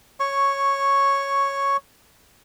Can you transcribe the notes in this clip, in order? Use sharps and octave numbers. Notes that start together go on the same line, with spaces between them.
C#5 C#6